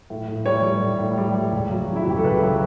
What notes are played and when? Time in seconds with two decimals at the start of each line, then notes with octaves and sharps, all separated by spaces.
0.10 A2
0.28 A2
0.46 G3 C#5
0.63 G3
0.82 A2
1.00 A2
1.18 G3
1.35 G3
1.52 C#2
1.71 F#3
1.88 C#3
1.96 E4
2.02 F#4
2.07 C#2 G4
2.17 A4
2.24 C#2 B4
2.41 F#3